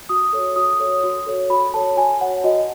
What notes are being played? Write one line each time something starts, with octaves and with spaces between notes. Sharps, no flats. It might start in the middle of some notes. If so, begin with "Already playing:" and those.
F#4 D#6
A4 C#5
F#4 D#6
A4 C#5
F#4
A4 C#5
F#4 B5
A4 C#5 A5
F#4 G#5
C#5 F#5
F#4 D#5